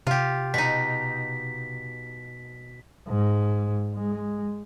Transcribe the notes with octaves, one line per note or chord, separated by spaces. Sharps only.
C3 F4 G4
B2 D#4 B6
G#2
G#3